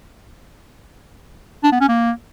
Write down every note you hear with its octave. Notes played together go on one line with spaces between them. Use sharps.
D4
B3
C#4
A#3